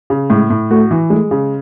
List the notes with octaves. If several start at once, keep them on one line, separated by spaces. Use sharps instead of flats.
C#3
A2 G#3
A2
A3 F#4
E3
G#3 A3
C#3